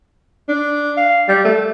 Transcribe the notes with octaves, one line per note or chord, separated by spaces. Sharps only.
D4
F5
G3
A3